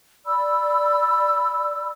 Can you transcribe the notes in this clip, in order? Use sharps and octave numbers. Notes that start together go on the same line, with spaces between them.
D5 B5 E6